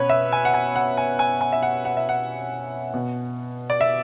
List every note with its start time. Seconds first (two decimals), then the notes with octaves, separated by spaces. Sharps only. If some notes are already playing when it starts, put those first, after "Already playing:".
Already playing: B2 C#4 B4 C#5
0.09 E5
0.32 G#5
0.45 F#5
0.54 G#5
0.76 F#5
0.97 G#5
1.19 G#5
1.41 G#5
1.53 E5
1.63 F#5
1.85 F#5
1.97 E5
2.09 F#5
2.94 B2
3.70 D5
3.81 E5